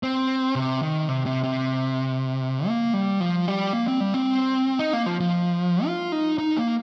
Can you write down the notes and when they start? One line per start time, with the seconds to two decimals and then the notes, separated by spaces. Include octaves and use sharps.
0.03 C4
0.55 C3
0.82 D#3
1.08 C3
1.26 C3
1.44 C3
2.68 A#3
2.94 G3
3.20 F3
3.48 G3
3.73 A#3
3.88 C4
4.00 G3
4.14 C4
4.79 D#4
4.93 A#3
5.06 F3
5.20 F3
5.86 F4
6.12 D#4
6.38 D#4
6.57 A#3